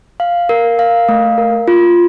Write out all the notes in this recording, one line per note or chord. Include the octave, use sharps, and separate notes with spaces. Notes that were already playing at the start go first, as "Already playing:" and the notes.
F5
A#4
F5
A3
A#4
F4